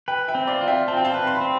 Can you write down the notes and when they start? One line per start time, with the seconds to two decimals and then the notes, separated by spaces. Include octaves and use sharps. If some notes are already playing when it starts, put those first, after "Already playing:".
0.08 B4 G5 B5
0.28 E5 G5
0.35 C4
0.47 D5 F5
0.61 F4
0.67 E5 G5
0.88 C4 A5
0.97 G5
1.05 F5 A5
1.14 B4
1.27 C6
1.35 B5
1.41 C4